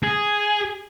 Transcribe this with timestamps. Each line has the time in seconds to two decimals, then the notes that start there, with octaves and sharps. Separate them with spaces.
0.03 G#4